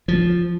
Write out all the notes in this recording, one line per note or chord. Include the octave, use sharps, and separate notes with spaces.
F3